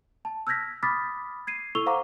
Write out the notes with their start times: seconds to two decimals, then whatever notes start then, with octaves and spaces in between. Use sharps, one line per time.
0.25 A5
0.47 E6 F6 G6 G#6 A#6 B6
0.83 B5 D6 D#6 F6 A6 B6
1.47 G#6 C7 D#7
1.75 E4 A4 C#6 E6 F7 G7
1.86 C5 F5 F#5 A#5 C#6 D6